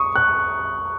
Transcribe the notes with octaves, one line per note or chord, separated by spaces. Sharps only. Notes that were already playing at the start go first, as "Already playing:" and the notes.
Already playing: C#6 D#6
F#6